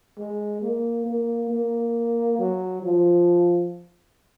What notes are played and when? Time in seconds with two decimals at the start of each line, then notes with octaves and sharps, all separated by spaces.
0.18 G#3
0.62 A#3
1.06 A#3
1.50 A#3
2.39 F#3
2.82 F3